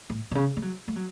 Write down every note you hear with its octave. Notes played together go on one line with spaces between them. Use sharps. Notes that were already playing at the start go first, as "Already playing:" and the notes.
A2
B2
C#3
A3
F#3
A3
F#3